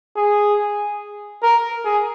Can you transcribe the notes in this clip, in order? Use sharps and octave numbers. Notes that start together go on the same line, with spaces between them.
G#4
A#4
G#4